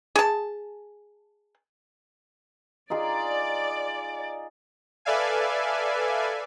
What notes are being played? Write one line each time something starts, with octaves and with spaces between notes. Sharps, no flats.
G#4 A5
D#4 F4 G#4 D5
A4 B4 D5 E5 F5 G#5